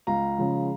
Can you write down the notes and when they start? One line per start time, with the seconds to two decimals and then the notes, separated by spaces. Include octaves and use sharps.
0.07 C#2 F5 A#5
0.38 C#3 F3 G#3